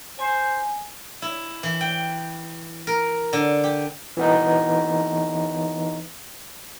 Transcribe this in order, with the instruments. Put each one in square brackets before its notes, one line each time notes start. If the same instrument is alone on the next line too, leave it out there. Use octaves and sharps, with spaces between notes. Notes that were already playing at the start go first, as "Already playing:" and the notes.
[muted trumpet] C5 [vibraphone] G#5
[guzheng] E4
E3
G5
A#4
D3
G4
[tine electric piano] E3 B3 D#4